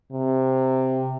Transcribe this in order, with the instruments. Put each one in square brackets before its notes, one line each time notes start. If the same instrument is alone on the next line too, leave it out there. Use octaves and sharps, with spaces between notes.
[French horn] C3